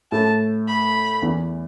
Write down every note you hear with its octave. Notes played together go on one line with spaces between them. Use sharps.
A2 A3 A5
B5
E2 E3